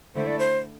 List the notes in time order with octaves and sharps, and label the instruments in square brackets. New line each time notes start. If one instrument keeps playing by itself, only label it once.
[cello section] D3 A3 E4 [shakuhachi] C5
[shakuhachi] D5
C5